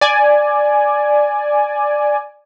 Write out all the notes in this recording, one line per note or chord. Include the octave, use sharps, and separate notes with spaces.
D5 G#5